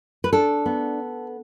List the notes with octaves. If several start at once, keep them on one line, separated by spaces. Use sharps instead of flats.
B4
D4 A4
B3